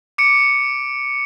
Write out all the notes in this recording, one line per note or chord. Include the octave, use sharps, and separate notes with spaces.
D6 C#7 D7